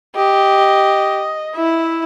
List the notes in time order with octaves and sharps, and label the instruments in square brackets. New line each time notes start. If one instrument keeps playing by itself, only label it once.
[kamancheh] G4 [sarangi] D#5
[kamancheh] E4 [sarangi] E5